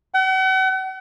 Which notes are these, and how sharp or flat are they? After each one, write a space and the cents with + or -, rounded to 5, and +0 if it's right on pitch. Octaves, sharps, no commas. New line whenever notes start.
F#5 +40